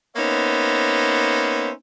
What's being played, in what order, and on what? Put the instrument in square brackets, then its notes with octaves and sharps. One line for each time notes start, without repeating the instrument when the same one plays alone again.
[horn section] A#3 B3 C#4 D#4 C5 E5